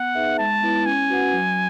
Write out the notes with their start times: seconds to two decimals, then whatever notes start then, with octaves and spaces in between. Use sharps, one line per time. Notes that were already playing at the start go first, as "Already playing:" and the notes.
Already playing: B3 F#5
0.15 D#4 G#4 B4 E5
0.38 G#3 A5
0.62 B3 E4 B4
0.86 C#4 G#5
1.10 F#4 B4 F#5
1.33 F#3